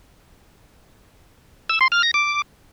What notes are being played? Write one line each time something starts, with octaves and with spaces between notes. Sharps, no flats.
E6
C6
F6
A#6
D6